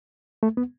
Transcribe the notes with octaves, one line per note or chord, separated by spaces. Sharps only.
A3
B3